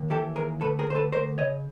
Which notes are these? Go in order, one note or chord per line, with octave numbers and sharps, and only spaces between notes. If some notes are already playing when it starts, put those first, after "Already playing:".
Already playing: D#2
E3 G4 A4
D#2 G#4 A#4
D2 A4 B4
G#4 A#4
D2 C5
A4 B4
D2 A#4 C5
C#3 C#5 D#5